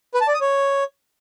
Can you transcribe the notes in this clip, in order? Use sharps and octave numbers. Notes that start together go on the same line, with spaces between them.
B4
A5
D5
D#6
C#5